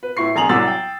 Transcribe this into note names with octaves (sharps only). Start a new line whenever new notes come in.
B4
A2 E4 C#6 C7
A#1 G#5 A#5 D#6 F7 F#7
C2 F#3 F#5 D6 E6 A6
G5